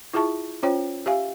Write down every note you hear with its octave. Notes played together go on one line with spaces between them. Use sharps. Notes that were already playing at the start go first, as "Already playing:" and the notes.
E4 F4 G#4 E5 A5 C#6
C#4 F4 C5 C#5 G5
G4 E5 F5 G#5